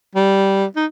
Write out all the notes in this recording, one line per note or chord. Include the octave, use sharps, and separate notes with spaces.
G3
D#4